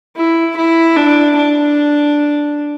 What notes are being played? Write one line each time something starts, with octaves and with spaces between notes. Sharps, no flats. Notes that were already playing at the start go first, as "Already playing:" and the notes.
E4
E4
D4
D4